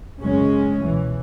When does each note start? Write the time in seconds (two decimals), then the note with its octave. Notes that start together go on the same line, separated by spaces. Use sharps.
0.21 F#2 C#3 G#3 C#4
0.84 C#2 B2 E3